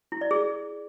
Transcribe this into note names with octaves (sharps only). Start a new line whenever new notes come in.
E4
D5
G#4